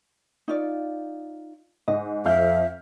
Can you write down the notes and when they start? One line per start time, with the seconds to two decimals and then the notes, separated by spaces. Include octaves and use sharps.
0.48 D#4 F4 D5
1.88 G#2 D#5
2.26 F2 E5 F5 F6 G6